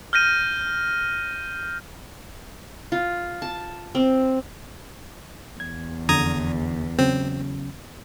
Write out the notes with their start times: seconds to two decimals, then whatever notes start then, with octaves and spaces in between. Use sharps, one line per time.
0.13 F6 G6 A#6 D#7
2.92 F4
3.42 A5
3.95 C4
5.60 E2 G#6
6.09 F2 D3 A#5 D#6 G#6
6.99 C#3 F#3 C4 C#4